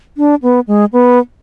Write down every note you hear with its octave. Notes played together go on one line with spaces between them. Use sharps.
D4
B3
G#3
B3